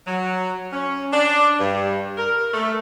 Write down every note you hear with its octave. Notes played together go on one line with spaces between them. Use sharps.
F#3
C#4
D4
G2
A#4
A3